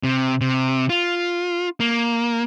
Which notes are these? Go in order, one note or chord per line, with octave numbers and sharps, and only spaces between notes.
C3
C3
F4
A#3